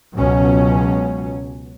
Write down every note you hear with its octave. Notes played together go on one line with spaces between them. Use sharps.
C#2 B2 F#3 C#4